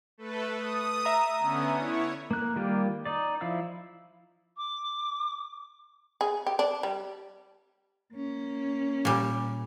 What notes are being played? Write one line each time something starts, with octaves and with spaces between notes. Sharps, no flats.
A3 A4 B4
D#6
E5 A#5
D3 B3 C#4
E4 C#5
A#3 F#6
D#3 G3 A#3 F4 G4
D#4 D5
F3 E4 F5 E6
D6
G#4
G4
D4
G3
A#3 C#4
A#2 G3